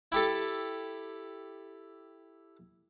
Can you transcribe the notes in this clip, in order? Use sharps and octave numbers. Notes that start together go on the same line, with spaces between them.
E4 G4 A4